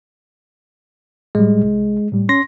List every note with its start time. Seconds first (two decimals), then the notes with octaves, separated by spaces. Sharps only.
1.35 A2 G3 G#3
1.63 C2
2.12 A2 G3
2.29 C#4 C6 A#6